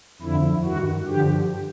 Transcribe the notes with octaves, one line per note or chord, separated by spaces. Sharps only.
F2 D3 F3 E4
G2 D#3 F#4
G2 D3 F3 G4